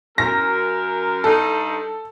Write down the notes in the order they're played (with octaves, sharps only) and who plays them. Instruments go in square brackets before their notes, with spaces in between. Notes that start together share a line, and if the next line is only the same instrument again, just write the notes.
[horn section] F#2 A#4 [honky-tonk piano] A#6
[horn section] G2 D#4 [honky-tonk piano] A4